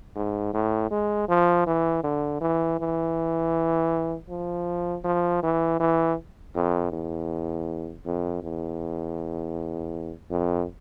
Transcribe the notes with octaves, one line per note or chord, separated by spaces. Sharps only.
G#2
A2
G#3
F3
E3
D3
E3
E3
F3
F3
E3
E3
F2
E2
F2
E2
F2